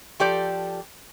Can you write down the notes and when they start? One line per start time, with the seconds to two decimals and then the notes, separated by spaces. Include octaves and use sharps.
0.20 F3 G4 A4 D5